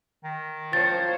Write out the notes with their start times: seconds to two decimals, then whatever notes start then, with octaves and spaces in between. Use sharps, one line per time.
0.24 D#3
0.73 F3 C5 C#5 A6